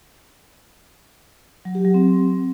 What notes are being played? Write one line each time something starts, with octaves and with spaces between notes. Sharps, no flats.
F#3
G4
F#3
C4